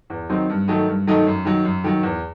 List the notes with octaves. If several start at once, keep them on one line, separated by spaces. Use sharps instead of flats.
E2
D#3 F#3 C4 D#4
G2
D#3 F#3 A3 D#4
G2
D#3 F#3 A3 D#4
F#2
D#3 F#3
F#2
D#3 F#3
E2